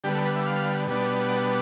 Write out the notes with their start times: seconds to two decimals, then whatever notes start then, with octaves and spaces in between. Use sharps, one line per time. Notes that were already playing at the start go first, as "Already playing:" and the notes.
0.04 D3 G3 B3 G4
0.15 A4
0.25 B4
0.36 E5
0.46 F5
0.87 B2 G3 B3 D4
1.29 F#5